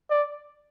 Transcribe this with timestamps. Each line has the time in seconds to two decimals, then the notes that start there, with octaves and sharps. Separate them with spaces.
0.10 D5